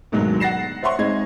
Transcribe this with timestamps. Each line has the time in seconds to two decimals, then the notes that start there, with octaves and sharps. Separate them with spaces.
0.12 D2 G#2 B2 D#3 F#3 G#3
0.40 F#5 A6 A#6 C7 E7
0.83 C5 C#5 E5 F#5 C6 C#6
0.99 G#3 C4 D#4 D#5 G#6